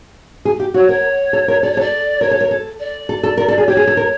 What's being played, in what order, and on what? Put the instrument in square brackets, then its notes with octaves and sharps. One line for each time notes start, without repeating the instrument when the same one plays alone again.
[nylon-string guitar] G#4
G4
[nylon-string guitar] F#4 [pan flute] C#5
[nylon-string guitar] A#4 [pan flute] C#5
[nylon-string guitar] A4
A#4
[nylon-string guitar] A4 [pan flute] D5
[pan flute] C#5
[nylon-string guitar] A4 [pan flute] D5
[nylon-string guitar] A#4 [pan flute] C#5
[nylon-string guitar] A4
[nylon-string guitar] A#4 [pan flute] C#5
[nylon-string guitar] A4
[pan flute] D5
[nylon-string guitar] A4
A4
A#4
A4
G#4
[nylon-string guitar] G4 [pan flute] C#5
[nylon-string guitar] G#4
A4
A#4